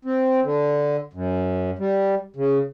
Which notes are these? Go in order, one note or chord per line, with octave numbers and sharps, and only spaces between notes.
C4
D3
F#2
G3
C#3